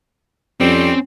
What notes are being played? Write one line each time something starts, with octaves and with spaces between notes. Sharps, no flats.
F2 G3 C4 C#4